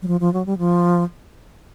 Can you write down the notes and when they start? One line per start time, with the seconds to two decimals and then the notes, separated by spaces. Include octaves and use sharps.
0.02 F#3
0.08 F3
0.20 F3
0.34 F#3
0.46 G3
0.58 F3